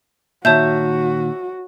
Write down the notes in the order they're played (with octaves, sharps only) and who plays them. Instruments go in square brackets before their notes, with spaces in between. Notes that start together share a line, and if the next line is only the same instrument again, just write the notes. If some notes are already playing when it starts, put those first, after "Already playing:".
[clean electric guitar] A#2 D#3 [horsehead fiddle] F#4 [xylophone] C#5 A5 G6 [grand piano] E5